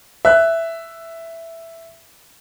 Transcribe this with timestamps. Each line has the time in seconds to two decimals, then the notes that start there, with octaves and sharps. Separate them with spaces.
0.25 E5 F#6